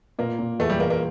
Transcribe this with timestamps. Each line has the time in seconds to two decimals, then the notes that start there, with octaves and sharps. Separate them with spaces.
0.19 A#2 A#3
0.39 A#2
0.59 E2 A3
0.70 G3
0.79 E2 A#3
0.90 A#3